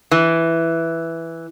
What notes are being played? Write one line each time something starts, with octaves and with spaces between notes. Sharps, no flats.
E3